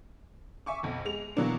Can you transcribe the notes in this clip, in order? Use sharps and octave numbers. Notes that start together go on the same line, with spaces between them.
E5 G#5 C#6 D6
B1 F2
G#3 F7
B2 E3 F#3 A#3 D4